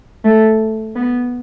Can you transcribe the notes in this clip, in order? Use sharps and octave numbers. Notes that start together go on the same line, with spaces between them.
A3
B3